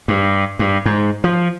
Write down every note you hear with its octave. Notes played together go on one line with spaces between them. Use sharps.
G2
G2
G#2
F3